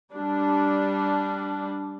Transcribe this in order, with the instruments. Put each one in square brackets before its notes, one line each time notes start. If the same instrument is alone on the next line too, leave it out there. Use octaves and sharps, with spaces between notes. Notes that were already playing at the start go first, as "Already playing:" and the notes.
[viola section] G3 D4